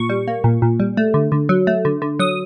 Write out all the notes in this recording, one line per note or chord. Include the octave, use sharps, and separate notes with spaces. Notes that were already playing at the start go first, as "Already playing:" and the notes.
Already playing: A#2 C#6
G3
A#3
A#2
A#2
G3
A3
D3
D3
F#3
A3
D3
D3
F#3 D#6